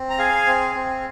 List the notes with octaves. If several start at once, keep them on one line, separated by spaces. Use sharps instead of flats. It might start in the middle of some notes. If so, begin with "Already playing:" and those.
Already playing: C4
A#5
G#4 F5 G#5
C4
C4